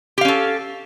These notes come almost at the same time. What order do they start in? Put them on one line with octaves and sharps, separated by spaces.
G4 F5 C#4 A4